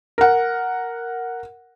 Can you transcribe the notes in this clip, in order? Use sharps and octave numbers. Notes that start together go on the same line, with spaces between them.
A#4 F#5